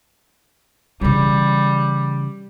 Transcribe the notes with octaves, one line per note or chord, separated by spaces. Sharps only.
C#3 E3 G3